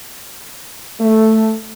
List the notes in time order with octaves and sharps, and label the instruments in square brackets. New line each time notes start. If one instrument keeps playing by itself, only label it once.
[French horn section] A3